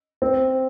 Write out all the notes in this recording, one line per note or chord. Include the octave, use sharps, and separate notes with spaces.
C4